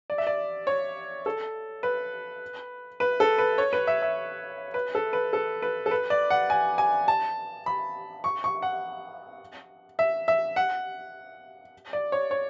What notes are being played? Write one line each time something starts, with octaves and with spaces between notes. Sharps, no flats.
D5
E5
D5
C#5
A4
B4
B4
A4
B4
C#5
B4
E5
E5
B4
A4
B4
A4
B4
A4
B4
D5
F#5
G#5
G#5
A5
B5
C#6
C#6
F#5
E5
E5
F#5
D5
C#5
C#5